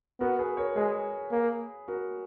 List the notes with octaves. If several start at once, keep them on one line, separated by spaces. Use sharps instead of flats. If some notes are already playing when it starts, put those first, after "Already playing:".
B3 F#4 A#4
G#4 B4
A#4 C#5
G#3 G#4 B4
A#3
F#4 A#4